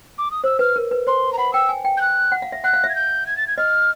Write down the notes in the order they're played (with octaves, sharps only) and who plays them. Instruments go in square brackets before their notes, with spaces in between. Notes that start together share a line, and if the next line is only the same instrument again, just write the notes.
[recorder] D6
D#6
[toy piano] C5 [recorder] E6
[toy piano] B4 [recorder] F6
[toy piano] A#4
B4
[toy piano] C5 [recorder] C6
[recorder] A#5
[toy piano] F#5 [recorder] B5
[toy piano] G5 [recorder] E6
[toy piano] G#5
G5
[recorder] G6
F#6
[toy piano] F#5
F5
E5
[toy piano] F#5 [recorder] F#6
[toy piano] F5
[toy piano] E5 [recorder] G#6
[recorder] G6
G#6
A6
G#6
[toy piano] D#5 [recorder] F6